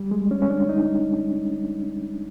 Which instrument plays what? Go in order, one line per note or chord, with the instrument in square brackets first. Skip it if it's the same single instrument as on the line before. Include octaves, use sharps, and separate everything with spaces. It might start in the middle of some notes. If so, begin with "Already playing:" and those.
Already playing: [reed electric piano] G3
G#3
C#4
C#4
D4
D#4